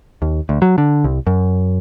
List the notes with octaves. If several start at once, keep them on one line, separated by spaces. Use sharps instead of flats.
D#2
D2
F#3
D3
C2
F#2